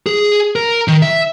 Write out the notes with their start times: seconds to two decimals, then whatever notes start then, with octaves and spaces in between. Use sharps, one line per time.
0.06 G#4
0.56 A#4
0.88 D#3
1.02 E5